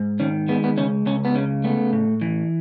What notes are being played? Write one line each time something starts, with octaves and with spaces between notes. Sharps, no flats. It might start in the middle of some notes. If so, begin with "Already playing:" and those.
Already playing: G#2
D#3 C#4
G#3 B3
B3
C#2 C#4
C#2 C#4
B3
C#3 C#4
A3 B3
A2
E3